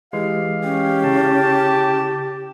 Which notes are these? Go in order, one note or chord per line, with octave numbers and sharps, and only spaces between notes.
E3 G#3 G4 F5
C#4 G4
C#3 E4 A5